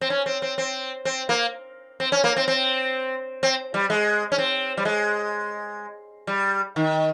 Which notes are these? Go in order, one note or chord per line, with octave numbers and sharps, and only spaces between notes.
C4
C#4
C4
C4
C4
C4
A#3
C4
C#4
A#3
C4
C4
C4
G3
G#3
C#4
C4
G3
G#3
G3
D#3